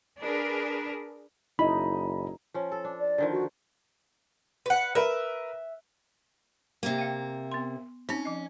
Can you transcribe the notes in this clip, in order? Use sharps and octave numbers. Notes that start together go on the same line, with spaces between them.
D4 G#4 A#4 B4
F#1 D#4 E4 D#5 B5
F3 C#4
A4
D4
D5
D3 D#3 F3
F#4
B4 F#5
A#4 B4 E5
C3 A#3
F5 G5
B3 C6
C4 C#4 D#4
F3 D#5